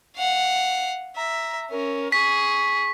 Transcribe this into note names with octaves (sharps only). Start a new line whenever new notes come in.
F5 F#5
E5 A#5
C#4 A#4
G#4 C#6 B6